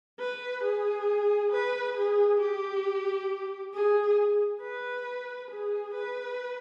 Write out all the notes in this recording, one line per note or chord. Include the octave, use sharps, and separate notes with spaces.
B4
G#4
B4
G#4
G4
G#4
B4
G#4
B4